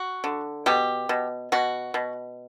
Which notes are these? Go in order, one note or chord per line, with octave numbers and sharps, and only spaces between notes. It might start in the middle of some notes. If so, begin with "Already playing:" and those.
Already playing: F#4
D3
B2 G4
B2
B2 F#4
B2